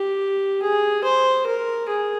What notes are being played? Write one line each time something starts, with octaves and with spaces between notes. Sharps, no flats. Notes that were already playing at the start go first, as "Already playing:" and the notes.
Already playing: G4
G#4
C5
A#4
G#4